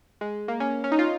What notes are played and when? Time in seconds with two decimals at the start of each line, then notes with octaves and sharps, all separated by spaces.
0.21 G#3
0.48 A#3
0.60 C#4
0.84 C#4
0.92 D#4
0.99 F4